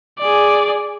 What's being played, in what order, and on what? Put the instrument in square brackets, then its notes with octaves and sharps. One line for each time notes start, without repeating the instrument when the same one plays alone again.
[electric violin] G#4 D5